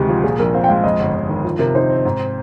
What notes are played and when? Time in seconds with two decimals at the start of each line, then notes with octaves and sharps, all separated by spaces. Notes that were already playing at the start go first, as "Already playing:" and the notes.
Already playing: D2 C3 D#3 G#3 G4
0.09 F3
0.24 A#2 G#4
0.39 A#1 A#4
0.54 C4 F5
0.64 G5
0.69 G#3 F5
0.84 F2 D#5
0.99 G1
1.14 G1
1.29 D#3
1.44 F3
1.59 C3 A#4
1.75 D#4 C5
1.90 C4
2.05 G#2